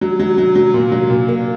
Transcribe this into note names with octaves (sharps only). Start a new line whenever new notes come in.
F#3
F#3
F#3
F#3
A#2
F#3
A#2
A#3